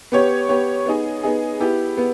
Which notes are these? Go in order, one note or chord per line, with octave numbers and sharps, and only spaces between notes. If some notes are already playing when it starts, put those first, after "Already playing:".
B3 G4 C#5
B3 G4 C#5
B3 D#4 G#4
B3 D#4 G#4
B3 E4 G4
B3